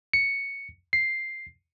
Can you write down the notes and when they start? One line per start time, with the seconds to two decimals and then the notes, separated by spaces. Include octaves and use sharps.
0.13 C#7
0.93 C7